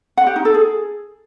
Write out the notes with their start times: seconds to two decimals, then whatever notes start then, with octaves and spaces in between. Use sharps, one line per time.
0.17 F#5
0.27 G4
0.36 D#4
0.45 A4
0.54 G#4